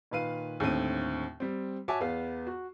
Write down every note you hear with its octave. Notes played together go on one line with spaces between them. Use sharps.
A#2 D#3 B4 F5 D#7
D#2 A2 D3 C4 D#7
G3 C4
F#4 C#5 E5 G#5 A5 D6
E2 B3 F5
F#4